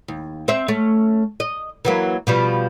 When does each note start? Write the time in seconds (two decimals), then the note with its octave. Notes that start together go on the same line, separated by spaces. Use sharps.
0.08 D#2
0.48 C4 C5 E5
0.68 A3 C#4
1.40 D#5
1.85 E3 F#3 A#3
2.27 B2 F3 G3